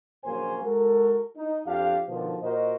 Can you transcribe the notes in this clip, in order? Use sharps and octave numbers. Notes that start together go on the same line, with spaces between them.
A#1 C#3 F#3 A#3 C5 G#5
G#3 F#4 A4 A#4
D#4
F2 D4 F4 G4 F5
B2 D3 D#3 F3
A#2 F#4 A#4 C5 D#5